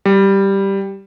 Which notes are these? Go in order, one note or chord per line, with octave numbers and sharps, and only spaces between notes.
G3